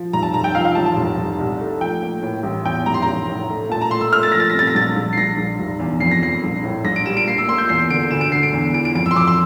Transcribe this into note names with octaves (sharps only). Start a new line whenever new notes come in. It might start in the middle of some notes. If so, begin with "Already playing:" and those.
Already playing: F3
F1 A#5
A5
F1 A#5
G5
F3 F5
F5
A1 A5
A5
F1
F1
C2
A3
F3 G5
A#3
A2
A1
E2 G5
F1 A#5
C6
A1 A#5
A2
A3
A#2 A5
A#5
A3 C6
E6
A3 F6
A6
F3 A#6
A6
A#6
C3 A6
A#6
A#1 A6
A#1
C7
A#1 A#6
A#1
F1
E2
F2 C7
A#6
F2 C7
A#1
A2
A#1 A#6
D7
G3 E7
D7
A#3 C7
E6
A#3 C6
G6
E2 C7
D3 D7
D2 E7
D7
D3 C7
D7
E2
E3 D7
D7
F2 D7
E6
C6
F2 D6
C6